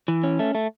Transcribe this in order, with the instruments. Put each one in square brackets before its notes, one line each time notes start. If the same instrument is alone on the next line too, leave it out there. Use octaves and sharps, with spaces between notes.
[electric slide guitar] E3
C#4
A3
A3